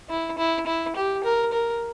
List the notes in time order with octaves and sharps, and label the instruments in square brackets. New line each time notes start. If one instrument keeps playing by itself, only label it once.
[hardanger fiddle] E4
E4
E4
G4
A#4
A#4